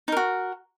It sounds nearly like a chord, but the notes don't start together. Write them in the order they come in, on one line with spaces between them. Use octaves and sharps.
D#4 A#4 F#4